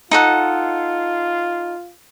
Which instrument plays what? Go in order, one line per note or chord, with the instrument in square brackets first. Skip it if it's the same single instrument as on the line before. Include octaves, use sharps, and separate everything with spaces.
[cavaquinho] D#4 A4 F#5 [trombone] F4